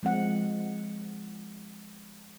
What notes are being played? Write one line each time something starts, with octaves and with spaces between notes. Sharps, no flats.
F3 G#3 C4 F#5